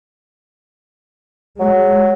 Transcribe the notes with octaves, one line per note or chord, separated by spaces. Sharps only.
F#3 G#3